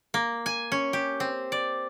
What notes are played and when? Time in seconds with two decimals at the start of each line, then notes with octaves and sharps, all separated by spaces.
0.14 A#3
0.46 G#5
0.72 C#4
0.93 G4
1.20 C4
1.52 D5